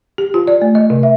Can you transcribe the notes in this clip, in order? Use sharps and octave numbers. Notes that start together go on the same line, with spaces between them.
G4
F4
D5
A3
D#5
C3
E5